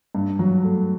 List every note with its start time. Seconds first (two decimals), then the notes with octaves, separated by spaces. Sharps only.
0.15 G2
0.39 F#3
0.64 A3